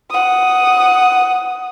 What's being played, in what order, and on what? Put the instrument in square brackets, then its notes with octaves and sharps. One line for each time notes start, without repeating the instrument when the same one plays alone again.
[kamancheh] F#5 D#6